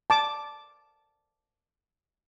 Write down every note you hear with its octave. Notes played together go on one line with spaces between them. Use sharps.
A5 D6